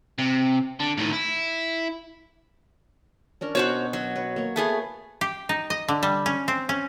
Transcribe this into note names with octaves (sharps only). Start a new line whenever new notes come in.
C3
D3
A2 D#3
E4
C#4 D4 A#4
B2 F#4 C5 C#5
F#3
B4 C#5
A#3 C#5
A3 B3 G#4
G4
D#4
D#5
D3
G3
C#4
C4
C#4